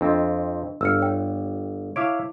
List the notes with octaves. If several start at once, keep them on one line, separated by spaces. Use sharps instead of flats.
F2 C4 D4 D#5
G1 E6 F6 C#7
C#5 G5
E4 C#5 E5 F5 D6 D7